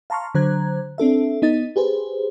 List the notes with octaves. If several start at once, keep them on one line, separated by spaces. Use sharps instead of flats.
F5 A5 A#5 C6 C#6 F6
D3 F#3 C5 A#5 F#6 G#6
C4 D4 A4 E5
B3 D#4 D#5 A6
G4 G#4 B4 C5